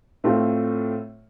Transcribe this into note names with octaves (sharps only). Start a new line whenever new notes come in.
A2 A3 C4 F4 A4